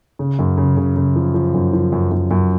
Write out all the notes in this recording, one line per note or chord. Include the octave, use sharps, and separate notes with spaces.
C#3
F#2
C#3
C#3
C#3
F3
F3
F#2
F3
F#2
F#2
F#2